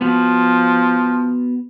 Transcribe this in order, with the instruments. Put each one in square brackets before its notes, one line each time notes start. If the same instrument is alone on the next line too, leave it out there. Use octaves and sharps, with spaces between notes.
[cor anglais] F3 [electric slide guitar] B3 F#4